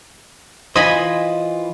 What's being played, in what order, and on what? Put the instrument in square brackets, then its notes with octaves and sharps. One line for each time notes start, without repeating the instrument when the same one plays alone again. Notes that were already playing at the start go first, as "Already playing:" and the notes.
[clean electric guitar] E3 F4 C5 [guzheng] D#5 G#5 B5